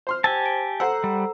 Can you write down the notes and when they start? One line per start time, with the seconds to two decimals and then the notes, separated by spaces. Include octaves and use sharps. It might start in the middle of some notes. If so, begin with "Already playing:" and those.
0.07 C5 C6 F6
0.24 G4 C5 G#5 A5 E6
0.46 D7
0.80 A4 C5 F#5 A#5 E6
1.04 G3